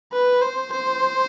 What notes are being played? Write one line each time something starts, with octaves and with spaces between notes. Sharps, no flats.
B4
C5
C5